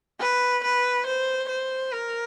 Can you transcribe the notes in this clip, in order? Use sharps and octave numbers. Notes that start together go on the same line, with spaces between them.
B4
B4
C5
C5
A#4